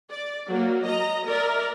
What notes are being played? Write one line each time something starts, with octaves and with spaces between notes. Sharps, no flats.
D5
F#3 A#3
D#5 A#5
A#4 D5 E5